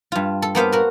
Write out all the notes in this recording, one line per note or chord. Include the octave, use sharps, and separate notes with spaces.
G2 F4
A4
A#3 B3 C5 F5
F#4 A#4